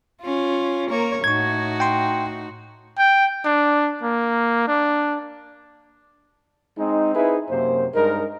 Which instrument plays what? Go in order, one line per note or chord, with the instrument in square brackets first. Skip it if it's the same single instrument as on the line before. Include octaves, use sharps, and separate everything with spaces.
[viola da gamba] C#4 F4
A#3 A#4 C#5
[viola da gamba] A2 D#4 F#4 [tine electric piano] C#6 G#6
[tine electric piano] G5 C6
[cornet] G5
D4
A#3
D4
[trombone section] G#3 C4 D#4
C4 D#4 E4 G#4 B4
F#2 C3 A#3 C5
G2 G#3 D#4 A#4